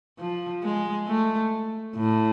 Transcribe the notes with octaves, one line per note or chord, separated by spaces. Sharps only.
F3
G#3
A3
A2